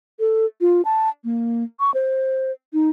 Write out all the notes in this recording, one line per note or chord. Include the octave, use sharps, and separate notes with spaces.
A4
F4
A5
A#3
C#6
C5
D#4